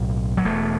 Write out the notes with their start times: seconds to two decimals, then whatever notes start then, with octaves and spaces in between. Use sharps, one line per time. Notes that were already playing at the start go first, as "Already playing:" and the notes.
Already playing: B1 A2
0.37 F#3
0.44 E1 E2 B2 A3